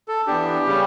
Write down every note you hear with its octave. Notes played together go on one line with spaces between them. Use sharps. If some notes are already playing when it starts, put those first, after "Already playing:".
A4
E3 B3 D4 G4
C#3 G3 C#4